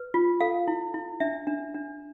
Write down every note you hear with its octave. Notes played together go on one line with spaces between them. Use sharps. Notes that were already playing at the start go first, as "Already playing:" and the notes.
Already playing: B4
F4
A4 F5
E4
E4
D4 E5
D4
D4